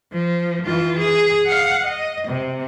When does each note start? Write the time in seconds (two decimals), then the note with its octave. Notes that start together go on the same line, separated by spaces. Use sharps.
0.13 F3
0.66 E3 F4
0.99 G#4
1.47 F5 F#5
1.85 D#5
2.27 C3